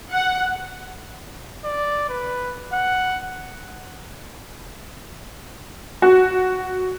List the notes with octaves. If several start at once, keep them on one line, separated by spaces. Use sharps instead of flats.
F#5
D5
B4
F#5
F#4